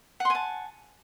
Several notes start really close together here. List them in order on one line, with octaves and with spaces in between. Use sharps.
F#5 C6 G#5 A5